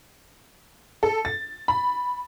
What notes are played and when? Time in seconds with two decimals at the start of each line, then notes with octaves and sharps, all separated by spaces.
1.03 A4
1.25 A6
1.68 B5